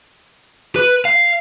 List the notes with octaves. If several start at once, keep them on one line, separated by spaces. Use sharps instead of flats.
B4
F5